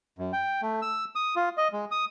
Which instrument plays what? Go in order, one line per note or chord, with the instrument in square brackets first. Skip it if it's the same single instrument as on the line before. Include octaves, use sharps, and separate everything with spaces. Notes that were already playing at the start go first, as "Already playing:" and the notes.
[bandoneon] F#2
G5
A3
E6
D#6
F4
D#5
G#3
D#6